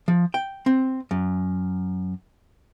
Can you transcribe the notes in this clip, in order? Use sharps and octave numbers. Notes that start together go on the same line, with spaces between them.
F3
G5
C4
F#2